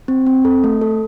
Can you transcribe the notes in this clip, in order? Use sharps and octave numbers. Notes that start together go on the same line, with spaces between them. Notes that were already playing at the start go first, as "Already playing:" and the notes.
C4
C4
A4
A3
A4